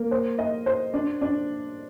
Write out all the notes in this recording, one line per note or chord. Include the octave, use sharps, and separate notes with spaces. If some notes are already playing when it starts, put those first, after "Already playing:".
Already playing: A#3
C5
D#5
C5
D4
D4